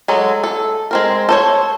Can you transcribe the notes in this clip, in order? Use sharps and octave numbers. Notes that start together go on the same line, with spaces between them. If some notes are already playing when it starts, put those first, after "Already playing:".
F#3 G#3 A4
A4
G#3 C4 A#4
A4 C5 C#5